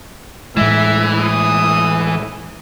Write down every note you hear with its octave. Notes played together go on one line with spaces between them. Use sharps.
A2 E3 G#3 E5
D#6